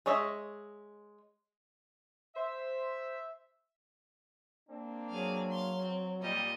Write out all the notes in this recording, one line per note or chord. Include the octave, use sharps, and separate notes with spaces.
G#3 C#5 D#5 E5
C5 E5
A#3 C4 D4
F#3 G#4 F5
F5 C6
C4
A#2 G3 F4 D#5